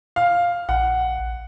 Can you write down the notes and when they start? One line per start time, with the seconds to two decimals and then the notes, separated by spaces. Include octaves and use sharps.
0.16 F5
0.69 A#1 F#5